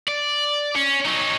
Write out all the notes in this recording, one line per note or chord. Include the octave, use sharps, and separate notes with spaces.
D5
C#4
F#3 D#4